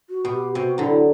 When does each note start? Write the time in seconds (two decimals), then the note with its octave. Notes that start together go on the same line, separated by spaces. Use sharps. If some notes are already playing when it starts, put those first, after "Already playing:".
0.10 F#4
0.25 B2
0.32 G4
0.55 C3 F#4
0.78 D3 F#3 E4